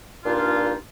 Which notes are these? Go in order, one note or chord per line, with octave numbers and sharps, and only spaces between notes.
G2 A#2 D4 D#4 F4